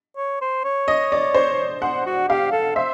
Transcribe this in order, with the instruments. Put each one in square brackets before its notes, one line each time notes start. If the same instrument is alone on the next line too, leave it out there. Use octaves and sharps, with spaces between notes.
[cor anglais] C#5
C5
C#5
[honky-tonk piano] D#5
D5
C5
[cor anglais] C5 [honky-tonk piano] F#5
[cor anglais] F#4
[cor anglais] G4 [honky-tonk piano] F5
[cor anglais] A4
[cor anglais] C5 [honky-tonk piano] E5